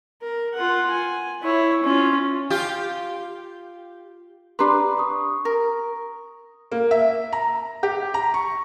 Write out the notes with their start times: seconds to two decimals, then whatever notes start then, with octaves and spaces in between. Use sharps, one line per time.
0.22 A#4
0.54 F4 F#5
0.91 G#5
1.43 E4 C#5
1.84 C#4 F4
2.50 F4 G4
4.59 D4 G4 B4 A#5 C6
4.98 C#6 D#6
5.45 A#4
6.71 A#3
6.91 E5
7.33 A#5
7.83 G4
8.14 A#5
8.34 C#6